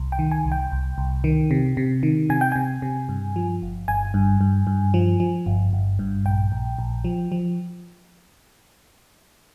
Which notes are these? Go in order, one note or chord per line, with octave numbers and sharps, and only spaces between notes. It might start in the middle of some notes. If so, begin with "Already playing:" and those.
Already playing: C2
G5
D#3
G#5
C2
G5
C2
C2
D#3
C3
C3
D#3
C3 G#5
G5
C3 G#5
C3
G2
F3
G1
G1 G#5
G2
G2
G2
F3
F3
G1
G1
G2
A#1 G5
A#1
A#1
F3
F3